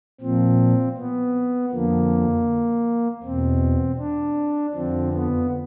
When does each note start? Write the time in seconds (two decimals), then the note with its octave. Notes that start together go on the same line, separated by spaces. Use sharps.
0.20 A#2 F3 C4
0.97 B3
1.72 F2 D3 F3 A#3
3.23 E2 B2 C4
3.98 D4
4.74 F2 D3 F3 C4
5.12 B3